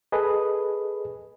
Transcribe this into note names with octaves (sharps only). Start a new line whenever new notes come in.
G#4 A4 B4 D#5